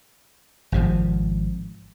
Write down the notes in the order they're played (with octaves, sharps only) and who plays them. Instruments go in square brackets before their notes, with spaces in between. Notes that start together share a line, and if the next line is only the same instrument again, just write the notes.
[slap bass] G#1 C3 F3